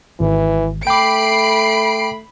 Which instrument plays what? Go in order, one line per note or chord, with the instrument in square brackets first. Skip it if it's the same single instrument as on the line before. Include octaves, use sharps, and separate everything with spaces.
[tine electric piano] G#1 [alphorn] E3
[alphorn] A3 [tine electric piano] G5 D6 [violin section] B5 C7 D7